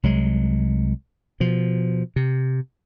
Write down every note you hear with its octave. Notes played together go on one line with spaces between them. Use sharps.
C2 F#3 G#3
B2 F3
C3